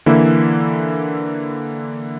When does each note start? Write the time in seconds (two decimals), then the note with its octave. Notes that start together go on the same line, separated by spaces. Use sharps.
0.06 D3 E3 A#3 E4